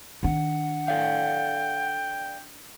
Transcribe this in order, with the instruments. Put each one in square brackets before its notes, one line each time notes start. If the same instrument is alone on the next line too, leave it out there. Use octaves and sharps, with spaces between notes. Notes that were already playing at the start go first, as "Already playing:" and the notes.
[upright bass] D#3 D4 [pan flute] F#5
[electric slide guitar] A4 D5 F5 [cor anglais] G5